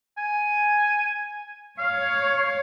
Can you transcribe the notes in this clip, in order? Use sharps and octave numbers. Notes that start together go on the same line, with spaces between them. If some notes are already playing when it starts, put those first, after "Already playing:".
G#5
C#5 F5